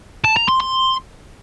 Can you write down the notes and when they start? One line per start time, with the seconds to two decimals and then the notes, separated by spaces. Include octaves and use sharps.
0.24 A5
0.36 A#5
0.48 C6
0.60 C6